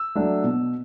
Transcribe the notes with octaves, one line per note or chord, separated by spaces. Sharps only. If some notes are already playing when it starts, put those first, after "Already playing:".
Already playing: E6
F#3 A3 D4
B2